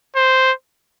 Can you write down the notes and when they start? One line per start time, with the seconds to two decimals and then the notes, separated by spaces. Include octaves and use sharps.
0.16 C5